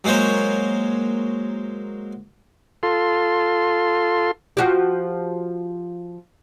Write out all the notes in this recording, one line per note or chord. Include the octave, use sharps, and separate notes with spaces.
F#3 G#3 A#3 C5 C#5
F4 A4 C6
F3 F#4 G4